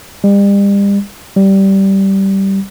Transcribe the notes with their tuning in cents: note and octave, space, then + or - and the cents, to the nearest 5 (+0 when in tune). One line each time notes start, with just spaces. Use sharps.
G3 +35
G3 -15